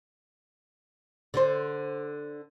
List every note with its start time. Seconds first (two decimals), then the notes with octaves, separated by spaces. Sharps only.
1.34 D3 A4 C5